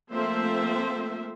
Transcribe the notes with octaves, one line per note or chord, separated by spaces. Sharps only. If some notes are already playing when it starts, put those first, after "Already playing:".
F3 A3 A#3 C4 C5 E5